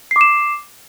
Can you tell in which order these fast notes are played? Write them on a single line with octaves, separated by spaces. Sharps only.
C7 D6 E7